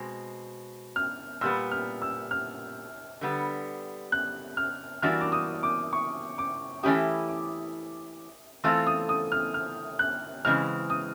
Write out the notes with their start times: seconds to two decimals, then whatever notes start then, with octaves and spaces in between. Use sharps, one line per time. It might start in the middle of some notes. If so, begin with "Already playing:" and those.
Already playing: B2 G#3 C4
0.96 F6
1.41 A#2 G3 B3 E6
1.71 F6
2.02 E6
2.31 F6
3.21 D3 G3 B3
4.12 F#6
4.57 F6
5.02 E3 G3 A#3 D4 F#4 F6
5.21 D6
5.32 D#6
5.63 D6
5.93 C#6
6.38 D6
6.83 E3 A3 C#4 E4 G4 D#6
7.28 D6
8.64 E3 A3 C4 F4 A4 E6
8.87 D#6
9.09 D#6
9.32 F6
9.54 F6
9.99 F#6
10.45 C#3 E3 G#3 C4 F6
10.90 D#6